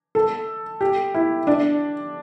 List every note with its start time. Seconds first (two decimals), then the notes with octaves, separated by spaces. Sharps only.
0.15 A4
0.81 G4
1.14 E4
1.47 D4